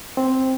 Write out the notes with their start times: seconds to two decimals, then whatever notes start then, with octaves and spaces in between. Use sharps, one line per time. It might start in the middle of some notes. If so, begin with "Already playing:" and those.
0.17 C4